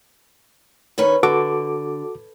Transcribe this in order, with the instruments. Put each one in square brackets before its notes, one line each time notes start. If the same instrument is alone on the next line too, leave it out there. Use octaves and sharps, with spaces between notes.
[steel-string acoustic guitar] D#3 C#4 B4
[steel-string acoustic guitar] D3 [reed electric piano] F#4 A4 D6